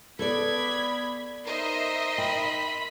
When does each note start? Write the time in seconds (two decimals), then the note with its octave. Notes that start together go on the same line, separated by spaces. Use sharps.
0.19 B3 A4 B4 D5 B5 G#6
1.45 D#4 A#4 C5 D#5 E5 C6
2.18 A#4 G5 B5